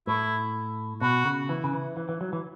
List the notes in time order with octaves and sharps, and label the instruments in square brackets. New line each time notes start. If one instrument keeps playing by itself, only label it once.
[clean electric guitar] A2 [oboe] E4
[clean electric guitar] B2 [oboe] F#4
[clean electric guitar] C#3
E3
C#3
E3
E3
E3
F#3
E3